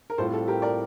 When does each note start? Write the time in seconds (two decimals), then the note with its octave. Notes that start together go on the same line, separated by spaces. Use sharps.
0.10 A#4
0.18 A2 G3 C4 F4 A4 C5
0.34 A4
0.48 G4 A#4
0.62 A#4 D5